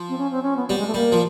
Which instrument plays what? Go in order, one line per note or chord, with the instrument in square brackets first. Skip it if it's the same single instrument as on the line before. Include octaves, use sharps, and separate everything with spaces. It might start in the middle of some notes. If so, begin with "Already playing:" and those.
Already playing: [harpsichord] F3
[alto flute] C4
C#4
C4
C#4
B3
[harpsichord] G3 [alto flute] B3
[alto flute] G#3
A3
[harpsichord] G3 [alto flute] A#3
[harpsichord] F3